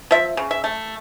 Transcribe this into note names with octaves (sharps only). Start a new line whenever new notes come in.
F3 E5
C#3
E5
A3